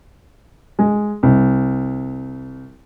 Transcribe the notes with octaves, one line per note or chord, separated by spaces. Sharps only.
G#3
C2